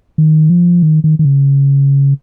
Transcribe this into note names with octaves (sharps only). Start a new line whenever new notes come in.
D#3
F3
D#3
D#3
D#3
C#3